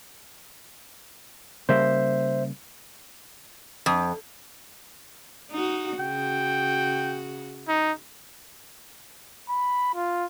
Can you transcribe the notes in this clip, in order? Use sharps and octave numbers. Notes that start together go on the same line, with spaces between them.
C#3 G3 A#3 C5 E5
F2
D#4 F#4
C#3 F#4 G5
D#4
B5
F4